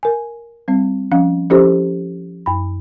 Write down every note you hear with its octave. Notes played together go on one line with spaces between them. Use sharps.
A#4 G#5
G3 C4
F3 C#4 F5 F#5
F3 C#4 E4 G4 A4 C5
F#2 B5